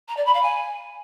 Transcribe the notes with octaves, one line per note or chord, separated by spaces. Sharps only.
A#5
D5
B5
F5
G#5